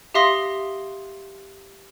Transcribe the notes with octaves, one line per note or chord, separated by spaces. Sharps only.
G4 E5 F5 C6 D#6 A#6